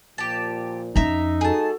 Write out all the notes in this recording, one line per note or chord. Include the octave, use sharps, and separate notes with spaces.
A#2 F3 G4 A5
F2 C#4 D#4 E5 A#5
G#3 F#4 G#4 A4 A5